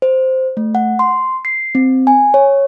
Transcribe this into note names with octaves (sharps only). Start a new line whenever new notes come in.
C5
A3
F#5
C6
C7
C4
G#5
C#5